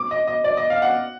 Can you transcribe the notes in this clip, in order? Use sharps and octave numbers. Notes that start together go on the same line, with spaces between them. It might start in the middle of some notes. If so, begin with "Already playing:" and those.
Already playing: D6
D#5
D#5
D5
D#5
F5
F#5